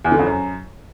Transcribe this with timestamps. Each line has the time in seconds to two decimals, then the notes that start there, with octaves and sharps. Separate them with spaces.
0.05 E2
0.12 D3
0.19 F2
0.26 F#2